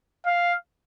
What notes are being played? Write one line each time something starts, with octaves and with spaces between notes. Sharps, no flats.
F5